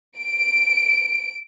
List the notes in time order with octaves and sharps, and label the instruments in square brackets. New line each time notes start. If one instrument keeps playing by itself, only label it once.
[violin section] D7